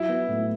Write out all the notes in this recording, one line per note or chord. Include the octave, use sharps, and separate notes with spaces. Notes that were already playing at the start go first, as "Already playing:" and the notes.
Already playing: F#3 E4
B3
A2